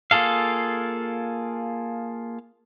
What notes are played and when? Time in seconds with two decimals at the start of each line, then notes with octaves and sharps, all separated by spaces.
0.11 A#3 F4 G#4 A4 F5